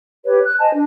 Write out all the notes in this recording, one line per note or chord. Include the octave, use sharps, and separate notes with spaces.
G4 B4 C#5
F#6
C5 D#5 G#5 A5
D4